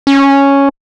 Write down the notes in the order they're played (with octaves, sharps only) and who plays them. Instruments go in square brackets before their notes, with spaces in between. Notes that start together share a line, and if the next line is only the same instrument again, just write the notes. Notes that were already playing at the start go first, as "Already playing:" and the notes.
[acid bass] C#4